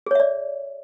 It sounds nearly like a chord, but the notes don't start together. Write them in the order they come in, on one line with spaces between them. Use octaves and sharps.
G#4 C#5 E5 D5